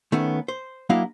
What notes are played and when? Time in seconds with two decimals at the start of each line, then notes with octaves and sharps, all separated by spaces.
0.12 D#3 A3 B3 C#4
0.48 C5
0.89 F#3 A#3 D4 E4 D#5 F5